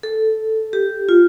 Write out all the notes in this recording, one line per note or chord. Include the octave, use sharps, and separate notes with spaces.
A4
G4
F4